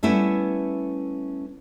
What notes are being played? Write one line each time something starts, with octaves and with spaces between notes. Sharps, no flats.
G3 A3 B3 C#4 E4